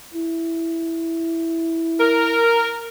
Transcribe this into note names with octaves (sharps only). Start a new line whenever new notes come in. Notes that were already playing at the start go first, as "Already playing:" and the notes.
E4
A#4